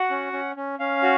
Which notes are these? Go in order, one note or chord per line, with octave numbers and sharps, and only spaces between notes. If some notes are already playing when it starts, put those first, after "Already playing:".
Already playing: F#4 F#5
C#4
C#4
C#4
C#4 F5
F#4